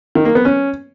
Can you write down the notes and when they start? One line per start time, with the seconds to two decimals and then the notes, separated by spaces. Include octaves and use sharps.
0.15 D#3
0.25 A#3
0.35 B3
0.45 C#4